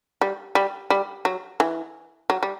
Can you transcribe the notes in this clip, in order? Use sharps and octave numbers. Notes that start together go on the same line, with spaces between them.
G3
G3
G3
F#3
E3
F#3
G3